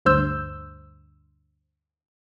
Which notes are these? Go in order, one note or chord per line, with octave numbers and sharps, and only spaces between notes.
D2 G2 C5 E6 G6